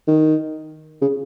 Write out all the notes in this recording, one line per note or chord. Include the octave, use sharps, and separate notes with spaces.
D#3
C#3